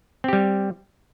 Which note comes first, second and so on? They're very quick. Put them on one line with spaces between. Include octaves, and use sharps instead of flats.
C4 G4 G3